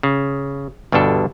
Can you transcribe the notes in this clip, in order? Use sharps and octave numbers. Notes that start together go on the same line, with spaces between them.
C#3
G1 B2 G3 D4 A4